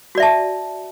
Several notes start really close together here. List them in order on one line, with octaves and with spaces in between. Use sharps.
F#4 D5 E5 A5